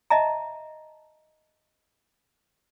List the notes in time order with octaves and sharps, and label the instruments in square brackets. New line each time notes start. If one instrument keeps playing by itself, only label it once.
[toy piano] D#5 E5 A5 A#5